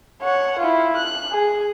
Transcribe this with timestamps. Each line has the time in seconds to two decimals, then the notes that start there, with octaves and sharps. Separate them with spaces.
0.22 C#5 F#5
0.59 E4 F4
0.96 F#6
1.32 G#4